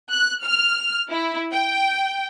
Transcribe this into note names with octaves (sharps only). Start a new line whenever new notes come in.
F#6
F6
E4
G5